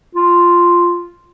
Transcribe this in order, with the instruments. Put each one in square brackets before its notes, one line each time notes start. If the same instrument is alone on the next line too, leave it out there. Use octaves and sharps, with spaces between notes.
[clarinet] F4